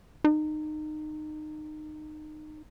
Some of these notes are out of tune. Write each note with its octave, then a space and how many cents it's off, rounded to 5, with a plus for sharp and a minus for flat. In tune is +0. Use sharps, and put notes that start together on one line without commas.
D#4 -25